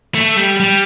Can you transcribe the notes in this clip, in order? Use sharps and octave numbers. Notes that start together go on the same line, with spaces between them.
A3
G3
G3